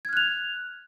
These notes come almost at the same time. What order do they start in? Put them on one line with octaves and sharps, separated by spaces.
G#6 F6 F#6 F7